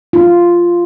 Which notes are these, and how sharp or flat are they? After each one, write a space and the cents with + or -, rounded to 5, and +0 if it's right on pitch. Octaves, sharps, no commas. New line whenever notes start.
F4 -5